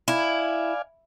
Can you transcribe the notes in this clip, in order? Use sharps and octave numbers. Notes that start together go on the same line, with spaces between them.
E4 D5 F5 G#5